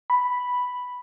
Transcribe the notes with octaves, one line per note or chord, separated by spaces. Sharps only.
B5